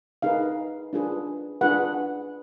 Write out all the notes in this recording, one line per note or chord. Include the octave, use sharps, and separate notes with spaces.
D#4 G#4 B4 F5
D4 F4 G#4 B4
D4 F4 G#4 B4 F#5